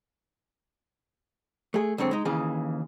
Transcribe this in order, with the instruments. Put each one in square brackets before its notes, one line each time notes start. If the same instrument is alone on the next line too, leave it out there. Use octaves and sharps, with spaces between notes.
[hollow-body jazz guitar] A3 G#4
C#2 F#2 D3 C4 C#5
G#3 D#4
D#2 C#3 E3 G#4